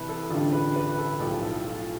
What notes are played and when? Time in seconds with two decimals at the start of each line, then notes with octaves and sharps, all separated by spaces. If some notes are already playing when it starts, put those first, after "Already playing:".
Already playing: C2 C3 E3 G3 B4
0.09 A4
0.30 A1 G2 D3 G3 F4
0.53 B4
0.76 B4
0.98 A4
1.20 B1 A2 F3 G4
1.43 A4
1.64 F4